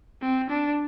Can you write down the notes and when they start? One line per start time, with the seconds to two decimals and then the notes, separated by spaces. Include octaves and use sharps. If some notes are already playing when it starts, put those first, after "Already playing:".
0.22 C4
0.50 D4